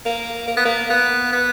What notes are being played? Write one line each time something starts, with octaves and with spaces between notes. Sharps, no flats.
A#3
A#3
B3
A#3
B3
B3